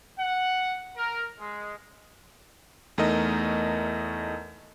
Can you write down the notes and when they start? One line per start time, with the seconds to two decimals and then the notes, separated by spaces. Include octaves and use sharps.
0.17 F#5
0.96 A#4
1.38 G#3
2.98 E2 A3 D#4 A#4 D#5